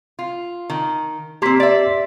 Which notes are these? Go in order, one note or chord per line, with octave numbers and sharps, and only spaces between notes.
F4
D#3
A#3 C4 G4 C6 B6
D5 E5